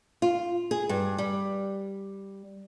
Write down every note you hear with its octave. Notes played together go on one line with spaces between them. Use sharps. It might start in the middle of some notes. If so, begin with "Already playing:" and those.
F4
G#4
G2
G3